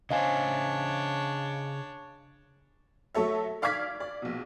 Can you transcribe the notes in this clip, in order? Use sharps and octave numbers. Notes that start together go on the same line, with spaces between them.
C#3 D4 C5 C#5 D#5 F5 G#5
F#3 A3 A4 C#5 E5
D5 F5 D6 F6 G#6 B6
D5
A#1 B2